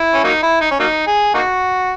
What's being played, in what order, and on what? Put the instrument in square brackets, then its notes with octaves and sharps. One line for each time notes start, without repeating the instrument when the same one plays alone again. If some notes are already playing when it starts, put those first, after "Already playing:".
Already playing: [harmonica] E4
C#4
F#3 A#3 D#4
E4
D#4
C#4
F#3 A#3 D#4
G#4
A#3 D#4 F#4